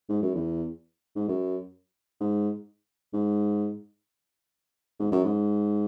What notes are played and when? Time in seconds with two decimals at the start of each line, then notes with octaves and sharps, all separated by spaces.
0.09 G#2
0.22 F#2
0.35 E2
1.16 G#2
1.28 F#2
2.21 G#2
3.13 G#2
5.00 G#2
5.12 F#2
5.25 G#2